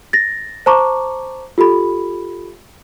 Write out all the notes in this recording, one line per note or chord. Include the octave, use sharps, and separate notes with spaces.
A6 A#6
C5 A5 A#5 C#6 D6
F4 G4 A4 B5